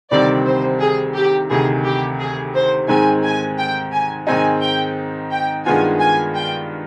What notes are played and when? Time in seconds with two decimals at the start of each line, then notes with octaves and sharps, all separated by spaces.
0.11 D2 C3 D#3 G3 C4 D5
0.45 C5
0.80 G#4
1.15 G4
1.50 D2 C3 D#3 G#4
1.85 G4
2.20 G#4
2.55 C5
2.88 G#2 D#3 G#3 C4 G#5
3.24 G#5
3.58 G5
3.92 G#5
4.27 G#2 D#3 G#3 C4 D#4 G#5
4.62 G5
5.31 G5
5.66 G2 D#3 G#3 B3 F4 G#5
6.00 G#5
6.35 G5